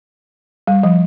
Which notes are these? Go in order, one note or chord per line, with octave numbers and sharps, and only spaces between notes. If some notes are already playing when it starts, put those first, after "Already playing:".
G3
F3